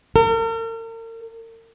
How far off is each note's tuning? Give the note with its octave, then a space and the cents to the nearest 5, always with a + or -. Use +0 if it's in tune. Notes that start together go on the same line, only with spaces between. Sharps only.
A#4 -40